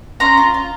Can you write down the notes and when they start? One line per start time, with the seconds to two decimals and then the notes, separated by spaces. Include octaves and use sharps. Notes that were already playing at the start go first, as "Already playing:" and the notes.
0.20 C#4 A#5 C6
0.37 F4
0.54 F4